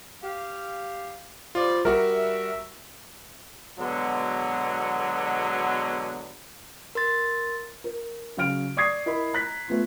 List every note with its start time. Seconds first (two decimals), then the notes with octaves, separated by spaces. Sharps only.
0.22 G4 F5
1.55 F3 G3 F4 D5
1.85 G3 F#4 A#4 E5
3.78 B2 D3 F#3 G#3 B3
6.95 A#4 C6 A6
7.84 A#4
8.37 C#3 F#3 F5 F6 D7
8.77 D5 C#6 D#6 G#6 C7
9.06 E4 A#4 D#5 B5
9.34 A#5 F#6 B6
9.68 A3 B3 F4